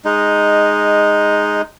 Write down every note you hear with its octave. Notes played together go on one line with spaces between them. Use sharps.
G#3 D#4